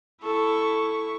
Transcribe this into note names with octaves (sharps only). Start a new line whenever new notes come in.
E4 A4 C#6